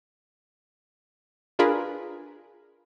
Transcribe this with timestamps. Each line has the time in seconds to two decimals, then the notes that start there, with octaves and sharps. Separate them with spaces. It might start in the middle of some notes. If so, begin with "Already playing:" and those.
1.59 D4 F4 G#4 A#4 B4